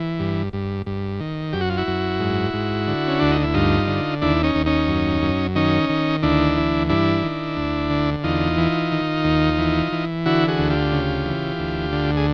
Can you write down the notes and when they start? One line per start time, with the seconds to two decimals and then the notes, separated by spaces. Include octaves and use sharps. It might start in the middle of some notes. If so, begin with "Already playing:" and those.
Already playing: E3
0.20 G2
0.53 G2
0.86 G2
1.20 D#3
1.53 F#2 G4
1.61 F#4
1.69 F4
1.77 E4 F#4
1.87 F#2
2.20 G#2
2.54 G#2
2.87 D3
3.08 C#4
3.20 D2 D4
3.31 D#4
3.43 E4
3.54 G2 D#4 F4
3.87 D3
4.22 D#2 D4 E4
4.43 C#4 D#4
4.55 D#2
4.66 C#4 D#4
4.88 F#2
5.22 F#2
5.56 D#3 C#4 D#4
5.89 D#3
6.23 D2 D4 E4
6.57 E3
6.89 G2 D4 E4
7.23 D#3
7.57 D2
7.90 D3
8.23 E2 D#4 F4
8.58 E3
8.91 D#3
9.24 D#2
9.59 E3
9.92 E3
10.26 D3 E4 F#4
10.48 F#4 G#4
10.58 D2
10.70 F4 G4
10.92 C#3
11.26 E3
11.59 D2
11.93 D3
12.17 G#4